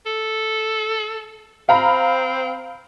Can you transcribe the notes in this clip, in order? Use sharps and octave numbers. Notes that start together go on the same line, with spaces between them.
A4
C4 F5 A#5 B5